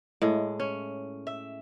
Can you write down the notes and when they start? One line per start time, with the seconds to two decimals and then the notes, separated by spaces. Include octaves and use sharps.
0.22 A2 G#3
0.60 C#4
1.27 E5